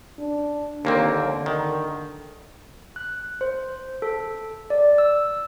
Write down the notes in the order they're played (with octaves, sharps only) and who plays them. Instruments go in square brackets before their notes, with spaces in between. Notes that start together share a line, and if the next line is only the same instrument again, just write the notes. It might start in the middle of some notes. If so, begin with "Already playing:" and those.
[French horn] D4
[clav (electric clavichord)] D#2 A#3 C4 [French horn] D3
[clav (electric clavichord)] D#3
[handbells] F#6
C5
A4
D5
E6